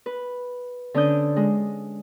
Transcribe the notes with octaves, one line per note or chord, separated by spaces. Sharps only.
B4
D3 C#4 D4 D#6 G6
G#3